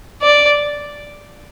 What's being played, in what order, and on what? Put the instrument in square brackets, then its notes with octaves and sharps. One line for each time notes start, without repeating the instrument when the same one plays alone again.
[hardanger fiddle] D5